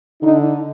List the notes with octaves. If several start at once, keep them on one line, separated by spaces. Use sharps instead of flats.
D3 D#4